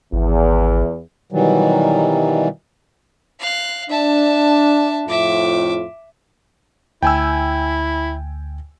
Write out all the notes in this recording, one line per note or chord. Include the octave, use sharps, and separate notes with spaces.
G#1 E2
B2 D#3 E3 F#3 G3
F5 F#6
D4 E5 A5
F2 A2 F4 E5 D6
D2 E4 G5 G#5 E6